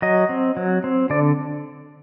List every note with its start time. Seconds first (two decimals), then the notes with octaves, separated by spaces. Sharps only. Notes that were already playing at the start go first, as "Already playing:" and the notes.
0.02 F#3 D#5
0.29 C4
0.57 F#3
0.84 C4
1.10 D3 D5